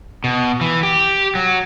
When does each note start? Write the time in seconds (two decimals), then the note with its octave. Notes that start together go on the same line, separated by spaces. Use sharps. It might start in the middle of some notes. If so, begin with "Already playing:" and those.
0.24 B2
0.61 E3
0.83 G4
1.35 F#3